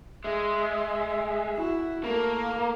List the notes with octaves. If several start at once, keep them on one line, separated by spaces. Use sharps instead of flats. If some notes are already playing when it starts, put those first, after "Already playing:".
G#3 E5
E4 F#4
A3 A#3 A#4